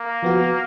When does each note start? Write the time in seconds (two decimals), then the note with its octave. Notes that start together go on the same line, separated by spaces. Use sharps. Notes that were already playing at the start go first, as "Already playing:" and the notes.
Already playing: A#3
0.23 F3 B3 F#4